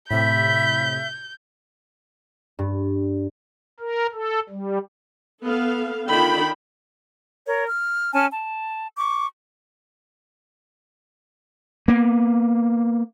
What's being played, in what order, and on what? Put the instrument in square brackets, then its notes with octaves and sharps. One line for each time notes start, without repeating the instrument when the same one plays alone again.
[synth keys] A2 C3 [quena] E5 [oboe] B5 [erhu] G6
[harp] G2
[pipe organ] A#4
A4
G3
[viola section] B3 A4 F5
D3 D#3 D4 F4 G5 B5
[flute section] A#4 C#5
F6
C#4 G#5 A5 F6
A5
C#6 D6
[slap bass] A#3 B3